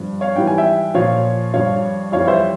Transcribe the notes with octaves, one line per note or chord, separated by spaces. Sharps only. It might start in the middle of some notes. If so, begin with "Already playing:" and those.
Already playing: G2 F3
C#5 F5
G#2 E3 G3 G5
G#5
E5 G5
A#2 F3 C#5 F5
G2 F3 C#5 F5
F2 E3 G3 C#5 F5
C5 E5